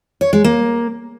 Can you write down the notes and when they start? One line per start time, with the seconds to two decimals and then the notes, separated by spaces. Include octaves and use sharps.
0.21 C#5
0.33 G#3
0.44 A#3